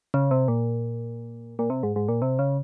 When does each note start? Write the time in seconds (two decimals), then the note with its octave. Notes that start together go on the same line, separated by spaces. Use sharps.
0.14 C#3
0.31 C3
0.48 A#2
1.59 A#2
1.70 C3
1.83 G#2
1.96 G#2
2.08 A#2
2.22 C3
2.39 C#3